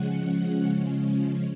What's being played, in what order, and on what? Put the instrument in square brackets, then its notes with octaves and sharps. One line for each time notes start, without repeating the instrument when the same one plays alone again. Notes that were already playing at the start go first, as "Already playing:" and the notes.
Already playing: [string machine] C#3 F3 G#3 C#4 F#5